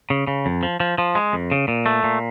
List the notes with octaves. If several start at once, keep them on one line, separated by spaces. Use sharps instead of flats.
C#3
C#3
F2
F3
F3
F3
G#3
F2
C#3
A#2
A3
A#2